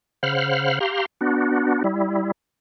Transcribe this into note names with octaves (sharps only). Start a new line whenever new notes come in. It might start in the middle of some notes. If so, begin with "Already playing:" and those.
C#3 C5 F5 F#5 B5 F6
G4 F5 A#5 C6
B3 D4 F#4
G3 E4